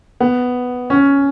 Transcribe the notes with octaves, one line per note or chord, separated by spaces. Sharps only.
B3
C#4